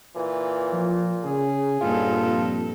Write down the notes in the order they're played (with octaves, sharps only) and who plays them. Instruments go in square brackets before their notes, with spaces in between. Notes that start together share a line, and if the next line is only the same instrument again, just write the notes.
[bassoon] A#2 [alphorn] E3
[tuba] F3
[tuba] C#3 [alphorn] G#4
[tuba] D#1 [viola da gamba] G2 A#2 A4 [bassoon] F4
[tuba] F2